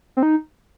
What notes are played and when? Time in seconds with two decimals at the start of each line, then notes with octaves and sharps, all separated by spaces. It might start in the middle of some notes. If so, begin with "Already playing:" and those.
0.17 C4
0.23 D#4